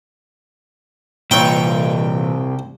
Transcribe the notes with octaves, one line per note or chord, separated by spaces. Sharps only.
C2 A#2 E3 C#5 G5